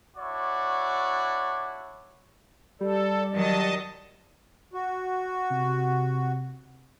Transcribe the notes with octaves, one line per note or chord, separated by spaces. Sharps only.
D4 E4 F#4 C#5 D5
G3 A4 D5
D#3 F#3 D#5 A5
F#4
C3